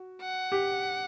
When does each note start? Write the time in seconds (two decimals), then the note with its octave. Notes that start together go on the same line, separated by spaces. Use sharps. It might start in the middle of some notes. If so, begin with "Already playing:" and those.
Already playing: F#4
0.22 F#5
0.52 G4